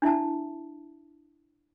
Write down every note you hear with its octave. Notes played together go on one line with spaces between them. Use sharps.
D4 E4 E5 A5